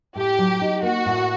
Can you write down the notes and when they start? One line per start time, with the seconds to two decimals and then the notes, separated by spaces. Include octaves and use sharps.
0.16 A2 G4
0.39 F#3
0.61 D#4
0.83 A#3 F#4
1.06 A2